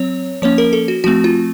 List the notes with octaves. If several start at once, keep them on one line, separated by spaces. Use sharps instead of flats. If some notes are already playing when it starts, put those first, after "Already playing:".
Already playing: F#3 C4 C#5
F3 A#3 C#4 C#5
A#4
A4
F#4
F3 A3 C4 F#4
F4